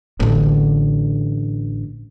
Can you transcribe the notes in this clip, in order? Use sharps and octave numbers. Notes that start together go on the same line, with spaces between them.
A1 D3